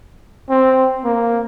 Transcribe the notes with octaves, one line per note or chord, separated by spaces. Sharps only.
C4
A#3